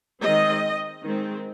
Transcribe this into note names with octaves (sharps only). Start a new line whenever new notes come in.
D#3 G#3 C4 D#5
D#3 G#3 C4